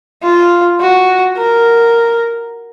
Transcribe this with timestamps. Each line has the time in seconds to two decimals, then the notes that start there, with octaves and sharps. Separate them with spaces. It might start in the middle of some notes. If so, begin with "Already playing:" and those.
0.23 F4
0.80 F#4
1.37 A#4